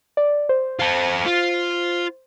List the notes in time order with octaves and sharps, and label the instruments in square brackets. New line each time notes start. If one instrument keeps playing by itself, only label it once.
[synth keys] D5
C5
[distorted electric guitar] F4 A4
F4